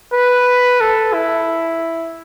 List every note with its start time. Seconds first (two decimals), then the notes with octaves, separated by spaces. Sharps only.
0.14 B4
0.81 A4
1.13 E4